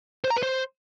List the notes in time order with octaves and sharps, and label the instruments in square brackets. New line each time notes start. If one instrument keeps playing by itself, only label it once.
[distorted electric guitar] C5
A#5
B4
C5